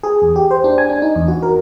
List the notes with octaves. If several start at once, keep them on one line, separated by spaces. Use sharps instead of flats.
G#4
E2
G4
C5
D4
G#5
D4
D#4
E2
F#4
A#4